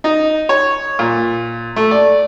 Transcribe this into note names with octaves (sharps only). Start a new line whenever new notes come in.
D#4
C#5
A#2
A3
D5